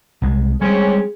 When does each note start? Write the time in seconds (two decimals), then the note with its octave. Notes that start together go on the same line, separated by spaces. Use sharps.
0.22 C2 G#3
0.62 G3 G#3 C4 C#4 G#4